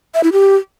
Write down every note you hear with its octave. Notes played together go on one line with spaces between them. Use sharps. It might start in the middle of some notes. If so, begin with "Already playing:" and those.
E5
E4
G4